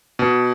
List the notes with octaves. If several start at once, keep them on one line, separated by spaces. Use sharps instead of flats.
B2